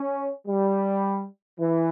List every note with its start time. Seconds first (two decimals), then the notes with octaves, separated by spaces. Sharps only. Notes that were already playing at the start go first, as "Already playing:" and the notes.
Already playing: C#4
0.47 G3
1.59 E3